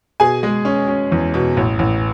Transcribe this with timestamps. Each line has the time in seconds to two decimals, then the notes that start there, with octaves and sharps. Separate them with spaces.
0.20 B2 G#4 G#5
0.43 G#3
0.65 C#4
0.88 C#4
1.12 E2
1.34 B2
1.57 A1
1.79 A1